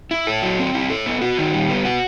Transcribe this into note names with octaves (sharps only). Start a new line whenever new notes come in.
E4
A4
F#3
C4
E4
A4
B3
F#4
D#3
G3
B3
F#4